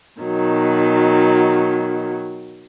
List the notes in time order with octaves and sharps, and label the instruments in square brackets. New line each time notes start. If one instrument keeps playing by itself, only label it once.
[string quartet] B2 D#3 F#3